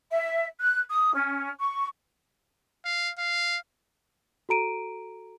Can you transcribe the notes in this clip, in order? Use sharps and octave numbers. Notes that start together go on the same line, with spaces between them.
E5
F#6
D#6
C#4
C#6
F5
F5
F#4 A4 A#5 D7 D#7